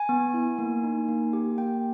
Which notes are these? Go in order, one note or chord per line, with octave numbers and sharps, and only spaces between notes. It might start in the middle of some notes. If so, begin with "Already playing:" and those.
Already playing: G#5
B3
E4
A#3
D#4
A#3
G4 G#5
A#3 G5